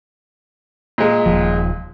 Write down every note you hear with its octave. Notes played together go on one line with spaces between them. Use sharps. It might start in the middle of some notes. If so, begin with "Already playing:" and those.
A#2 G#3
D#1 F3